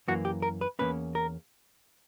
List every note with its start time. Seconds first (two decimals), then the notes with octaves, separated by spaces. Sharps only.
0.08 F#2 E3 A#3 F#4
0.25 G4
0.42 A#4
0.61 B4
0.79 E2 B2 A#3 C#4 B4
1.15 A#4